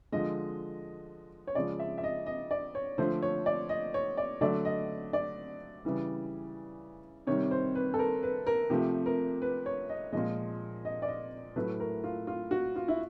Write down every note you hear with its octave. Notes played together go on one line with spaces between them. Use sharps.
D3 F3 G#3 D#5
C#5
C#3 F3 G#3 D5
E5
E5
D#5
D#5
D5
C#5
D3 F3 A3 C5
C#5
D5
D#5
C#5
D5
D3 F#3 A3 D5
D#5
D5
C#3 E3 G3
C3 D#3 G3 C#5
C5
B4
A4
A#4
B4
A#4
C3 F3 A3 G4
A#4
B4
C#5
D#5
A#2 F3 G#3 D#5
D#5
D5
D#5
A2 F#3 A3 B4
A#4
F4
F4
F#4
F4
E4